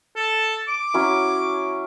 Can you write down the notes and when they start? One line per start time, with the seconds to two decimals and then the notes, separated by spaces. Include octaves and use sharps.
0.16 A4
0.68 D6
0.94 F#3 C#4 E4